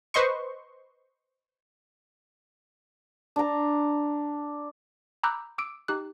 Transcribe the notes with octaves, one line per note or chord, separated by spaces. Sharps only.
B4 C5 D#5 C6 C#6
D4 A#5
A#5 B5 D6 E6 F#6 G6
D6 E6 D7
D#4 G4 F#6